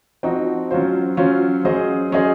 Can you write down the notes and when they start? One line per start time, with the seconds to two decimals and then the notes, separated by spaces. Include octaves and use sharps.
0.23 F3 C4 D#4 F#4
0.71 F#3 C#4 F4 C5
1.17 F#3 C#4 F4 C5
1.65 F#3 C#4 G#4 C5 D#5
2.12 F#3 C#4 G#4 C5 D#5